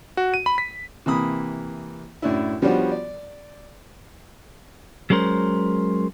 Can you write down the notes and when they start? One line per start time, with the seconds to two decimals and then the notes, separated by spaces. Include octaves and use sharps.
0.17 F#4
0.34 D#7
0.46 B5
0.58 B6
1.06 C3 E3 A#3 B5 D#6
2.22 F#2 A2 D4 E4
2.62 F3 G3 B3 C#4 D4 F#4
2.92 D5
5.10 F#3 G#3 C#4 A#4 C5